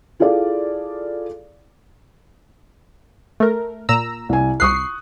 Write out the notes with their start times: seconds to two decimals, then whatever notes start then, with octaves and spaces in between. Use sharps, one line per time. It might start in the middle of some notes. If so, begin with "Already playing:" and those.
0.20 E4 F4 G#4 A4 D5 F5
3.40 A3 A#4
3.89 A#2 A#5 E6
4.29 C2 G#5
4.60 C2 C#6 D#6 F#6 C7